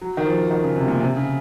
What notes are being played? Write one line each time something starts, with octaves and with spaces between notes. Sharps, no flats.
F#3
D#3
F3
D#3
C#3
C3
A#2
C3
C#3